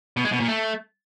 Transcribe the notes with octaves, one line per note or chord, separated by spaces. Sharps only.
B2
G#3
B2
A#2
A3